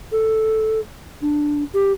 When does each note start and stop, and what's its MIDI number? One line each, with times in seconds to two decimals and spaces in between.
0.12 0.80 69
1.22 1.64 62
1.74 1.92 67